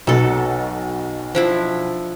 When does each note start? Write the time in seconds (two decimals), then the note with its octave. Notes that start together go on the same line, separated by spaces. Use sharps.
0.07 B1 B2 F#3 A4
1.35 F3 D4 E4